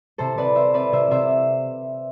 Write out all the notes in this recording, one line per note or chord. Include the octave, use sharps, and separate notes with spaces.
C3 A4 C5
C3 B4 D5
C4 C5 E5
C4 B4 D5
C3 C5 E5
C3 C5 E5